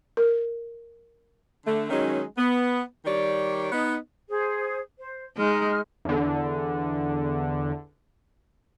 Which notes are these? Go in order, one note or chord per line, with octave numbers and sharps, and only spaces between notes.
A#4
D3 A3
D#3 F#3 G#3 C#4 D#4
B3
D#3 G3 C#5 D5
B3 D#4
G#4 C5
C5
G#3 D#4 F6
E2 D3